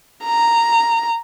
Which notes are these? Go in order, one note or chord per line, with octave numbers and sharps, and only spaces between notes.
A#5